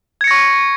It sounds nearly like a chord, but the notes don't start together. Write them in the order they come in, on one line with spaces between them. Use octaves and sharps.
G#6 C#7 A#6 C#6